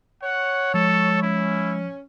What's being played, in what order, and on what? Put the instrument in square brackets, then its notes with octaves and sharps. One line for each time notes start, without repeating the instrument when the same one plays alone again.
[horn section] C#5 [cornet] F#5
[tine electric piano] F3 [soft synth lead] G#3 [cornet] A4
[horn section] C#4 [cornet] E4